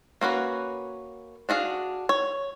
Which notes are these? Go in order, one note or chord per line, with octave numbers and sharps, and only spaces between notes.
A#3 C#4 F#4 B4
D4 F#4 G#4 F5
C#5